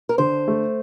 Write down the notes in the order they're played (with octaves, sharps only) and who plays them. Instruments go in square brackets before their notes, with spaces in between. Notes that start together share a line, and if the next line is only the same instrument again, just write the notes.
[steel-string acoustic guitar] A#4
[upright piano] D3 [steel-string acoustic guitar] C5
[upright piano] A3